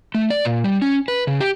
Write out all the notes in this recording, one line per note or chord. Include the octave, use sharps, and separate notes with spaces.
A3
D5
A#2
G3
C#4
B4
C#3
G4